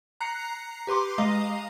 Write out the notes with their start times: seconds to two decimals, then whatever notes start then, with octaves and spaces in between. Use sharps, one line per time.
0.20 A#5 F#6 C7 C#7
0.87 G4 B4 C6 D6
1.18 G#3 D#5 F5 A#5 D#6